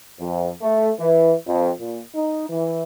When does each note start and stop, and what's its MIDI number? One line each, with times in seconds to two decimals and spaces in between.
0.20 0.52 41
0.62 0.90 57
0.99 1.34 52
1.47 1.71 41
1.79 2.01 46
2.15 2.45 63
2.50 2.83 52